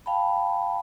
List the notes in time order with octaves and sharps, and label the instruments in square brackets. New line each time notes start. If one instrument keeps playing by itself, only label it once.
[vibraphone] F5 G5 A5 B5